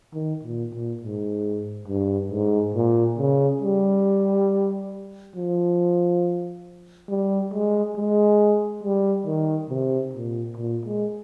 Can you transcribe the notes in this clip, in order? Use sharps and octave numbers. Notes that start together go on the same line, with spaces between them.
D#3
A#2
A#2
G#2
G2
G#2
A#2
C#3
G3
F3
G3
G#3
G#3
G3
D#3
C3
A#2
A#2
G#3